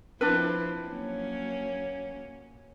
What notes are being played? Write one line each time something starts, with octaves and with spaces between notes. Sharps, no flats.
F3 C4 D4 E4 B4
F#3 A#3 C#4